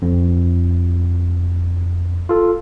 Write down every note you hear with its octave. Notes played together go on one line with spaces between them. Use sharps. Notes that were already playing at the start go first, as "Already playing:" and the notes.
F2
F4 A4